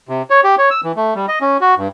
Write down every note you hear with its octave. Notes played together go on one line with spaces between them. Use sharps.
C3
C#5
G4
C#5
E6
E3
A3
G3
D#5
C#4
F#4
G2